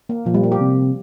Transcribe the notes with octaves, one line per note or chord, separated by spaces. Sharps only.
A#3
A#2 F3
G3
A#3
G4
C3